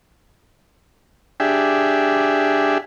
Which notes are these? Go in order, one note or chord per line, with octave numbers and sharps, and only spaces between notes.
D4 G4 G#4 E5